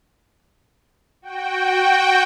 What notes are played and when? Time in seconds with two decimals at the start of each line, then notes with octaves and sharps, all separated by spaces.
1.22 F#4 G5